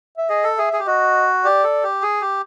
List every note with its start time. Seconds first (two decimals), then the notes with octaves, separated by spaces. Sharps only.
0.17 E5
0.29 G#4 D#5
0.44 A4
0.58 G#4 E5
0.73 G#4
0.80 G4
0.87 F#4 D#5
1.44 G4 D5
1.64 A4
1.83 G4
2.02 G#4
2.21 G4